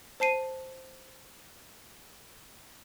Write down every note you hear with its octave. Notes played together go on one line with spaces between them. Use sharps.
C5 A5 C7 D#7